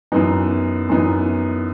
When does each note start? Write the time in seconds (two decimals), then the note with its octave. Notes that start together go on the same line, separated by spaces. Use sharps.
0.12 F#2 E3 B3 D#4
0.89 F#2 E3 B3 D#4